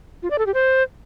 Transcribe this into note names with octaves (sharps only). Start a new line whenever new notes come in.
F4
D5
A4
G4
C5